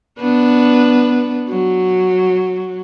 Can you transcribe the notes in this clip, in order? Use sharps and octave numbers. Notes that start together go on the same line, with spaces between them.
B3 D4 B4
F#3